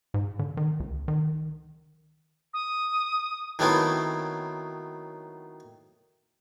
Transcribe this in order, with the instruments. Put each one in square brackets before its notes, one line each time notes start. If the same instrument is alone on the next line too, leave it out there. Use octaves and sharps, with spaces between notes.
[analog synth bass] G#2
D3
D#3
C#2
D#3
[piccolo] D#6
[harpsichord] D#3 F#3 A3 B3 C4 E4